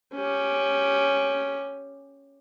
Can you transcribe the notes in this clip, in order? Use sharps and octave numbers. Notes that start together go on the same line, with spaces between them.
C#4 G4